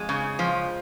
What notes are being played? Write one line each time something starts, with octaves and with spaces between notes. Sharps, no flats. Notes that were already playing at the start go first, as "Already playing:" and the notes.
Already playing: F2 G#3
C#3
F3